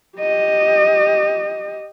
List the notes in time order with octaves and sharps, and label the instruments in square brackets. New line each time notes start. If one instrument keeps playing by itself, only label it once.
[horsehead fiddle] G4 D#5